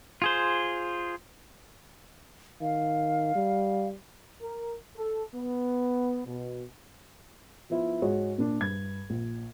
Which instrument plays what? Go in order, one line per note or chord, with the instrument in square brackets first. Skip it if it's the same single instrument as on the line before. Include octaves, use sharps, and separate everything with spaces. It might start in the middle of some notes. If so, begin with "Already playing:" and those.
[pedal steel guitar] F4 G#4 C5
[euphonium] D#3 [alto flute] F5
[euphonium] G3
[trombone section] A#4
A4
B3
B2
[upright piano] F3 B3 E4 F4
G#2 F#4 G#4 C#5
A#2 D4
G2 G#6
A#1